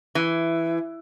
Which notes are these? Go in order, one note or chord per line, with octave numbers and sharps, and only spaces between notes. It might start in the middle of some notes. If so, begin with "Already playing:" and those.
E3